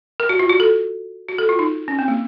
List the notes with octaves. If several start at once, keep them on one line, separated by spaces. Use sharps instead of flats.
A#4
F#4
F4
F#4
A4
F#4
A4
F4
D#4
C#4
C4
A#3